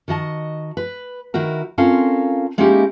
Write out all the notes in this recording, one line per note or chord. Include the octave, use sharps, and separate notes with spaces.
D#3 F#4 D#5 A5
B4
D#3 E4 F#4 A#4
C4 C#4 F4 A4 A#4 F5
G#3 A#3 C#4 D#4 E4 G4